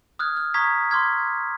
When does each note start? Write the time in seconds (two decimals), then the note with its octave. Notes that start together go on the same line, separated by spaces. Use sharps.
0.19 D#6 F6 F#6 G#6
0.37 F6
0.54 A#5 C#6 D#6 G#6 B6
0.90 C6 D6 F6 G#6 B6